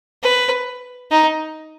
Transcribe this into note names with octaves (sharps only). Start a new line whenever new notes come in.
B4
D#4